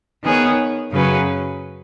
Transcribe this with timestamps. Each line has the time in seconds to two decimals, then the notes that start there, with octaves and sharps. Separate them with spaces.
0.22 D#3 B3 G#4 C#5
0.91 F#2 C#3 F#3 C#4 B4